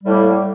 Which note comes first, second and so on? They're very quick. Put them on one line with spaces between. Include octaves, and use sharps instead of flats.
G3 A2 A#3